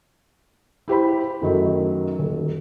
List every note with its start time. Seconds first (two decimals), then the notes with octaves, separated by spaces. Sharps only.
0.88 E4 G4 C5 B5
1.42 F#2 D#3 F#3 A3
2.19 D#1